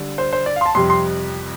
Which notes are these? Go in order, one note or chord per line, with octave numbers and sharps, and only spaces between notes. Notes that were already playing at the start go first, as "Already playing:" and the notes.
Already playing: D3 G3 D4
C5
C5
D5
F5
C6
A5
F2 C3 G3 C6
C6